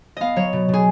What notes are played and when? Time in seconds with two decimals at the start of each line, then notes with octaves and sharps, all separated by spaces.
0.17 B3 D#5 F5
0.36 F#3 C#5
0.53 B2
0.69 B2 G#4